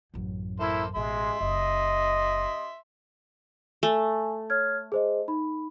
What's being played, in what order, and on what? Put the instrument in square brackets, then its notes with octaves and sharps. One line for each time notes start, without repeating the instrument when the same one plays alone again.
[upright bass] A1 F#2
[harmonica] A#3 A4 C5 [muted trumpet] E4
[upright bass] A1 B2 [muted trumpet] G#3 [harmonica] E5 C6
[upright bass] F#1 [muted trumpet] D#5
[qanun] A3 [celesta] G#5
[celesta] C#5 F6 G#6
G#4 C5 D#5
D#4 B5